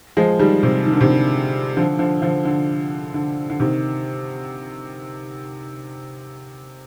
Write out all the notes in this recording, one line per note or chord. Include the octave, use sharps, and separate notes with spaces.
F3 G#3
D#3 G3
C3
D#3
D3
C3 D#3
D3 F3
D3 F3
D3 F3
D3
D3
D3
C3 D#3